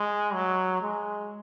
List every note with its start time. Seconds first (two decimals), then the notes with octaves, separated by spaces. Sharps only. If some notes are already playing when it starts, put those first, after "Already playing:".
Already playing: G#3
0.33 F#3
0.81 G#3